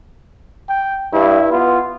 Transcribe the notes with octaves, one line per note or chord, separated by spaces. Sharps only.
G5
G2 E4
B3 F4